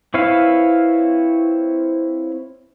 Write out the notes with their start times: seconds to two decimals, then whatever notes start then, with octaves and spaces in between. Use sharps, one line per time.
0.14 C4 E4 B4 C#5 F5